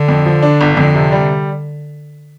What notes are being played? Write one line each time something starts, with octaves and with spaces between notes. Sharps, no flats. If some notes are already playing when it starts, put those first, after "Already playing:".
Already playing: D3
F2
F3
D4
G1
F2 D3
C3
G3